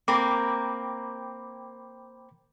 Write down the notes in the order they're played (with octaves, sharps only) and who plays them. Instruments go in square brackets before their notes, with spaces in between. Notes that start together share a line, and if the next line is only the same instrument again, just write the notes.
[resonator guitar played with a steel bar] A#3 C4 A#4 [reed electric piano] G5 B5 D6